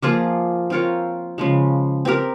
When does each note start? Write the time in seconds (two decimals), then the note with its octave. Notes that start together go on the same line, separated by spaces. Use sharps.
0.03 F3 A#3 F4 G#4
0.70 C4 F4 A#4 C#5
1.38 C#3 F3 G#3
2.05 C4 G4 A#4